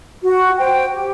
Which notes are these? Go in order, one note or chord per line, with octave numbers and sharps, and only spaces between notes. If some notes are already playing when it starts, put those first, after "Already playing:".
F#4
C5 G5
G4